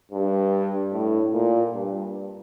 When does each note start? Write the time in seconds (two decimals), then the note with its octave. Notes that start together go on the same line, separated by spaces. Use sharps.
0.12 G2
0.92 A2
1.33 A#2
1.74 G2